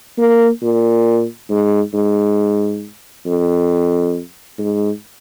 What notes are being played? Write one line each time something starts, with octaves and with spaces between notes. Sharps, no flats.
A#3
A#2
G#2
G#2
F2
G#2